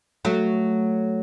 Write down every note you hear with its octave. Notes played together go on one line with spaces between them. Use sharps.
F#3 A3